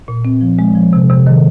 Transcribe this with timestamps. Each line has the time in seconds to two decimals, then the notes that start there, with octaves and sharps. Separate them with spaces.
0.08 A#2
0.25 C4
0.41 F3
0.59 G#3
0.75 F3
0.93 C3
1.10 C3
1.26 D#3